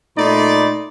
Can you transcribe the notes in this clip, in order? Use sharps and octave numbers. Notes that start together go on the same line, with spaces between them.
A#2 A3 D#4 D5 B5 C6